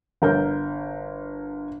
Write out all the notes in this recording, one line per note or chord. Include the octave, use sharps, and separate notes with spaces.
G1 A#4 G6